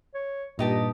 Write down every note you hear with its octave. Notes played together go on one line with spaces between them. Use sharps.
C#5
G2 A#2 D#4 G4 D#5 A5 D#6